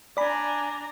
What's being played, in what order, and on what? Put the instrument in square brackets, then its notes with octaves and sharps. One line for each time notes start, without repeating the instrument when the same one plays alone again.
[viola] D4 A#5 [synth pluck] D5 B5 [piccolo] G#5